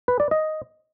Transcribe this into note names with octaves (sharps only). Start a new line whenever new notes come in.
B4
D5
D#5